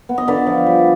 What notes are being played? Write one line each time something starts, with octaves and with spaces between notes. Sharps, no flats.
B3
D#5
D3 B4 D5
F3
G3